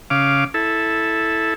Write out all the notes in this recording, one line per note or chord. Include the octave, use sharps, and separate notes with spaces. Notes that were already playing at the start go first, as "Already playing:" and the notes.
C#3 F5 D6
E4 A4